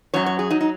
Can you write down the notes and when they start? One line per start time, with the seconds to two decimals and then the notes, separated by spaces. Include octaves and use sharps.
0.14 F#2 F#3 C#5
0.26 C#5
0.39 G#4
0.50 F#3 D#4
0.61 D#4